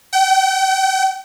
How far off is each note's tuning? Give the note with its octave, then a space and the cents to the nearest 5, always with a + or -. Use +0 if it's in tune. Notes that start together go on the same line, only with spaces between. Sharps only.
G5 -40